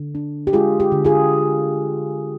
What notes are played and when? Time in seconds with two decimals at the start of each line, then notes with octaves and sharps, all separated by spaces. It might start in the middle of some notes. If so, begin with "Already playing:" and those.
Already playing: D3
0.15 D4
0.47 G4
0.53 G#3 F4 G#4
0.80 G4
0.92 D3
1.05 F4 G#4